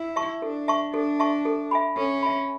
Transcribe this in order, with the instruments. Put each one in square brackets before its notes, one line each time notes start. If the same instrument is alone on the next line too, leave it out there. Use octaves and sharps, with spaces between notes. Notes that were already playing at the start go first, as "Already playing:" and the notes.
Already playing: [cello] E4
[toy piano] E5 A5 C#6
[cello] D4 [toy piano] A4
[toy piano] E5 A5 C#6
[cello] D4 [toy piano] A4
[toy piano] E5 A5 C#6
A4
E5 G#5 B5
[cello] C#4 [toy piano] A4
[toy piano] E5 G#5 B5